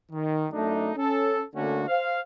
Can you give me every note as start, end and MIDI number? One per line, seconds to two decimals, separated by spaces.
0.11 0.46 51
0.52 0.91 42
0.52 0.91 57
0.52 0.91 62
0.52 0.91 63
0.96 1.42 61
0.96 1.42 69
1.54 1.83 50
1.54 1.83 57
1.54 1.83 58
1.54 1.83 61
1.54 1.83 66
1.88 2.19 72
1.88 2.19 77